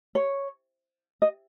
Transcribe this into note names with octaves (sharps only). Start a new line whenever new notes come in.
C#5
D#5